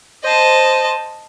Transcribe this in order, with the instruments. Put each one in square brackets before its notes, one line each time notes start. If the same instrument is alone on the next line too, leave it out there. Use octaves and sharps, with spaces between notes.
[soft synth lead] C5 [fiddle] D#5 A5